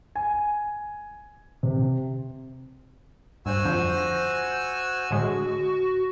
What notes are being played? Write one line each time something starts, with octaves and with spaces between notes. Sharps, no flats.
G#5
C3
G2 F#4 C5 G#5 E6
F2 D3 F3
A#6
A2 D3 G#3 F#4